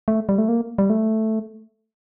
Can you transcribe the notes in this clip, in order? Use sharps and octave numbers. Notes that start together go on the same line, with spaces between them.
A3
G3
A3
A#3
G3
A3